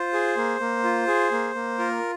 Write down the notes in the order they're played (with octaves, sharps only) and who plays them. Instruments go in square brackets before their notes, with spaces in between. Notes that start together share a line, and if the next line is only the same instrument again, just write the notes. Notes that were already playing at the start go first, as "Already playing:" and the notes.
Already playing: [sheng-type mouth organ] F4 C5
G#4
A#3
A#3
F4
G#4
A#3
A#3
F4 A#4